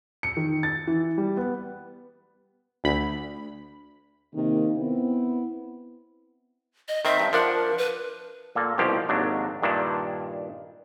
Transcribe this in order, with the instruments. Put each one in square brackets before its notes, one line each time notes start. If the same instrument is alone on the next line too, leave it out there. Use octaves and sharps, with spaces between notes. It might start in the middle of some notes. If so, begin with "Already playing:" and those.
[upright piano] C#7
D#3
A6
E3
G3
B3
[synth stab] D2 B5
[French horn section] C3 D#3 A#3
B3 C4 E4
[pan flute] D#5
[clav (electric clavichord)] D#3 C4 [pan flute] E5
[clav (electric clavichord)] G2
[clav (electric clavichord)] F3 D4 F#5 [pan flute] A#4
[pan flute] B4
[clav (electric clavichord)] A#2 A#3 A4
C2 B2 F3 A#3 G4
G#1 D#2 F#3 D4
G2 A#2 D#3 D4 E4